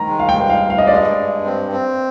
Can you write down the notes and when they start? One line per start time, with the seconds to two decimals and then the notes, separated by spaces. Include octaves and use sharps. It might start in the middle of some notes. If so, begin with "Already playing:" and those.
Already playing: D#3 A#5
0.08 G#3
0.20 F5
0.29 G5
0.35 G2
0.50 F5
0.62 G2
0.70 F5
0.78 D#5
0.87 G#3 D5
0.96 D#5
1.18 G2
1.45 C4
1.72 C4